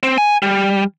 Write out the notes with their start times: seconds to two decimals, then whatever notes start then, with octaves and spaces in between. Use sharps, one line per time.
0.03 C4
0.18 G#5
0.42 G3